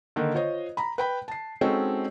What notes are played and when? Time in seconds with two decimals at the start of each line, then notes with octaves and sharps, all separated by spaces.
0.16 D3 D#3 A#3
0.34 F4 C5 C#5 D#5
0.77 A#5 B5
0.98 B4 G5 B5
1.28 A5 C7
1.61 G#3 C4 C#4 D#4 F#4 A4